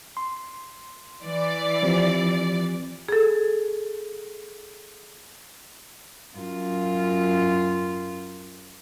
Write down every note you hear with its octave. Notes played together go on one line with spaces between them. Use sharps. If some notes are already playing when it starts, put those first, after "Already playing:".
C6
E3 D5
F3 C4 G4
G#4 A4
F#2 F4